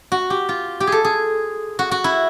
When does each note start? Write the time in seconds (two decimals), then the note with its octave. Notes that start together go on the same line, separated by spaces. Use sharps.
0.12 F#4
0.30 G4
0.49 F4
0.80 G4
0.87 G#4 A4
1.04 G#4
1.79 F#4
1.91 F#4
2.04 E4